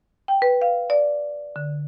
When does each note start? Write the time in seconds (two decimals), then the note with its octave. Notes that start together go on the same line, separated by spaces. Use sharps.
0.28 G5
0.42 B4
0.62 F5
0.90 D5
1.56 D3